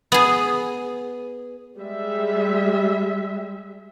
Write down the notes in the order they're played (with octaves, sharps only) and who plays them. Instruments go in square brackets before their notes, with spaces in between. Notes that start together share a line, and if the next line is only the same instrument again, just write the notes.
[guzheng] B3 G#4
[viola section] G3 G#3 E5